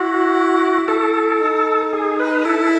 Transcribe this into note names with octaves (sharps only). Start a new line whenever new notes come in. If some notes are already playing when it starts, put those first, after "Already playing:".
Already playing: E4 F#4
E4 A4
D#4
G#4
B4
E4 A4